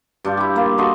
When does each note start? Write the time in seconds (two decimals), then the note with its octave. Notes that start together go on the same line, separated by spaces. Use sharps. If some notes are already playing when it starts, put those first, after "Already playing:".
0.25 G2 D4 F4
0.37 E4 G4
0.56 A#3 F4
0.78 F#4 A4 D#5 C6